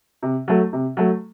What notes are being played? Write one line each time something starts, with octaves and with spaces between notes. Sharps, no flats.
C3
F#3 A3
C3
F#3 A3